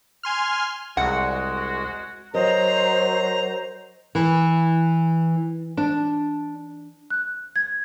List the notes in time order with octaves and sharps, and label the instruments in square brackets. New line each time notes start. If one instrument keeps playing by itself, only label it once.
[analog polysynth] G#5 C6 F6
[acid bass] C2 [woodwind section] G#3 F#4 [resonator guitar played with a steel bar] F#5
[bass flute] F#3 [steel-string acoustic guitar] A#4 D#5 [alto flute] C5 [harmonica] A#5
[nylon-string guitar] E3
D4
[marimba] F#6
G#6